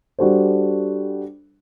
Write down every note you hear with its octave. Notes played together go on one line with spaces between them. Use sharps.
G3 D4 F#4 A4 C5